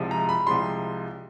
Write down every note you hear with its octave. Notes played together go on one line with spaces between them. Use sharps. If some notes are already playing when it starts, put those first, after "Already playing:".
Already playing: C2 C3 F3 G#3
A#5
B5
C2 C3 F3 G#3 C6